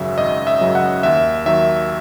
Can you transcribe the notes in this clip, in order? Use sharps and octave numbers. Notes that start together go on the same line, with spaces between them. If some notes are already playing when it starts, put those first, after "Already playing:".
Already playing: G#1 F#2 C#3 F#3 E5
G#1 D#5
E5
F#2 C#3 F#3
F#5
D#2 E5
D#3 F#3 E5